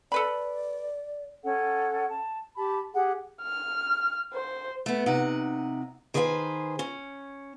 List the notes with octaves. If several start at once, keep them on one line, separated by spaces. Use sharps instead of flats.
A4 B4 D5 B5
C#4 A4 F#5
A5
G4 A5 B5
G4 G#4 F#5
F6
C5
A3 B3
C3 D#4 F#5
D#3 G#4 B4 C5 G5 G#5
C#4